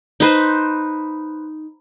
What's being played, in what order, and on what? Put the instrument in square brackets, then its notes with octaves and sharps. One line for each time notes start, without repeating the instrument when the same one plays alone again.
[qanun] D#4 B4 C5